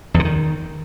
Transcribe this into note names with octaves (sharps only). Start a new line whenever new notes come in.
E2
D3
D#3